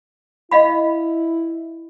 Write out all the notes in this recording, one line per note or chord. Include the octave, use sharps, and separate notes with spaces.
E4 D#5 F5 B5